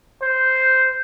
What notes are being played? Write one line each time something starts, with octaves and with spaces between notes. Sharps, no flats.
C5